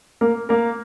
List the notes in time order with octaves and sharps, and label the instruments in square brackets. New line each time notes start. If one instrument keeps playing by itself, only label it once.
[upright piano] A#3 A#4
A#3 A#4